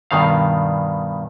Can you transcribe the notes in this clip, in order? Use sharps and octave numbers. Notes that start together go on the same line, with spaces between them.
G2 B2 D#3 F5